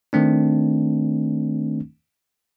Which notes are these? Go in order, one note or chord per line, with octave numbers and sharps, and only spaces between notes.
D#3 A3 C4 D4